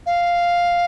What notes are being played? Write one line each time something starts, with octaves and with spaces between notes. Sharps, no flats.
F5